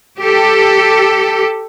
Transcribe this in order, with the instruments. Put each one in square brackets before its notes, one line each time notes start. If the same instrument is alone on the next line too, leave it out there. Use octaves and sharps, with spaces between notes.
[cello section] G4 A4